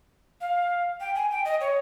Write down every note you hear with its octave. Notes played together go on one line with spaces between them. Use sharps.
F5
G5
G#5
G5
D#5
C#5